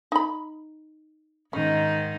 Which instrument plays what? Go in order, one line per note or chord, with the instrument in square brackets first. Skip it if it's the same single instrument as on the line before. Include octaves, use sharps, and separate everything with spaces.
[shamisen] D#4 B5
[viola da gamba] G#2 D#3 D#4 [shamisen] C#4